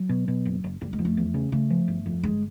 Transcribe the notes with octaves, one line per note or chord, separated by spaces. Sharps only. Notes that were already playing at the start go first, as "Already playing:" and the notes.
Already playing: F#3
B2
B2
F#1
F#1
F#1 G3
G#3
F2
A3
E2
C#3
C#3 A3
F3
G1
F2
G1 G#3